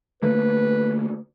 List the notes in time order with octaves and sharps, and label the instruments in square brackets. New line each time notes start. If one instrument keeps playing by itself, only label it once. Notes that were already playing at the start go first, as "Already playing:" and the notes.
[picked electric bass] D3 A3 A#3 [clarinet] B4